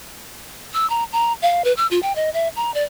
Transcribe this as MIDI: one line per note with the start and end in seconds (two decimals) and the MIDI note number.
0.74 0.88 88
0.90 1.04 82
1.12 1.33 82
1.42 1.64 77
1.64 1.73 71
1.77 1.87 88
1.91 2.00 65
2.02 2.15 79
2.15 2.30 75
2.33 2.48 76
2.56 2.73 82
2.74 2.83 74